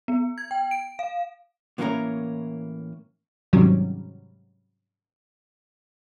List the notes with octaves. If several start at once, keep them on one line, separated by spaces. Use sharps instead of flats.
B3
G#6
G5
D7
F5
A2 E3 A#3 C#4 A#4 A#5
G#2 C3 D#3 F#3 G3 C#4